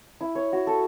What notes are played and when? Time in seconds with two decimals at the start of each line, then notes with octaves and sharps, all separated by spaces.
0.21 E4
0.35 C#5
0.53 F#4
0.67 A4